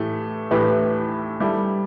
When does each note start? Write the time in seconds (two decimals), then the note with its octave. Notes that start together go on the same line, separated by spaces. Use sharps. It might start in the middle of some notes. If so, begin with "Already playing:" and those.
Already playing: A2 E3 A3 G4
0.51 A2 E3 A3 G4 B4
1.40 G3 E4 A4